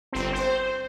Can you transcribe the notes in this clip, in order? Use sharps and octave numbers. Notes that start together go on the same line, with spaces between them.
G1 C4
C5